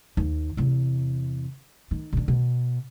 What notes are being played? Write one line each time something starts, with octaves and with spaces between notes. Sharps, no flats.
D#2
E2 C3
D#3
B2 D3
B2